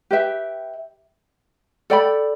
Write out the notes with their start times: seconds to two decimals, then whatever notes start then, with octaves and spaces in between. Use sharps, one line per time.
0.11 G4 B4 E5 G5
1.90 A4 D5 G5 B5